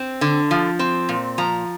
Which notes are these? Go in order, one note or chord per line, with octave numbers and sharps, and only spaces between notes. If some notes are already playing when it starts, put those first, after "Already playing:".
Already playing: C4
D3
F3
C4
A#2
F3 A#5